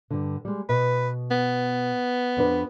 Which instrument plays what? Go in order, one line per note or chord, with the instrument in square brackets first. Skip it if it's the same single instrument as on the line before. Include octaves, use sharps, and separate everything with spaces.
[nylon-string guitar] G2 D3
G3 G#3
[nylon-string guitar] B2 D#5 [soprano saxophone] B4
[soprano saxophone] B3
[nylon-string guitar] F2 D4 B4